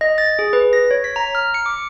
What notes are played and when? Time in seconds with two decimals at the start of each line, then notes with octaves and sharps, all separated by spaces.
0.01 D#5
0.18 A6
0.39 G#4
0.53 B4
0.73 A#6
0.91 C#5
1.04 B6
1.16 A#5
1.35 F6
1.54 C#7
1.66 D6